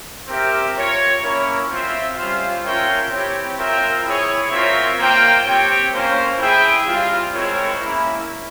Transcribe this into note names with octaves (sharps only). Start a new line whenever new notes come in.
C4 G4 A#4 E5
F4 A#4 C#5
A#3 C#4 E4 A#4 C#5
C4 F4 C5 E5
G3 C#4 F4 C5 F5
C#4 F4 A#4 E5 G5
C4 E4 G4 C#5
C4 F4 A#4 E5 G5
E4 G#4 C#5
C4 F4 A#4 C#5 E5
A#3 F4 C5 G5
C4 G4 C#5 G5
A#3 C#4 F4 C5
E4 G#4 E5 G5
G3 C4 F4
G#3 C4 E4 A#4 C#5
A#3 C#4 E4